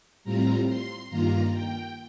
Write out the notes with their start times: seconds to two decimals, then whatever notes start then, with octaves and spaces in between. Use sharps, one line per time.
0.24 A2 G3 C4 F4 A#5
0.67 C6
1.09 G2 D#3 A#3 F4 A#5
1.52 G5